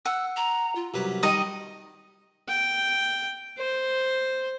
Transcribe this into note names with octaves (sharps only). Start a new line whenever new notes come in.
F#5 E6
A#5
F4
C2 F#2 G4 B4
D#3 G3 D#4 D#5
G5
C5